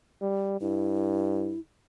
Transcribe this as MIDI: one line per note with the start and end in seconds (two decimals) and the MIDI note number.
0.21 0.59 55
0.60 1.54 43
0.60 1.60 64